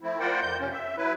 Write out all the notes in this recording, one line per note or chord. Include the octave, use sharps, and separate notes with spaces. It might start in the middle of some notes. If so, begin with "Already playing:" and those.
F3 A3 C4 E4
F4 A#4 C5 D5 F#5 G5
F2 G6
C3 C#4
E5
F#3 E4 B4